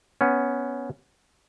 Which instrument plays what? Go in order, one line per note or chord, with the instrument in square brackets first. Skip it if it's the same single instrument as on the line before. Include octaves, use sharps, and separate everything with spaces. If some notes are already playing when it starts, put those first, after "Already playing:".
[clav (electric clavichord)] B3 C#4